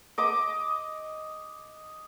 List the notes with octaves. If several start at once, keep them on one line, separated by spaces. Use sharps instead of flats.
D#5 D6 D#6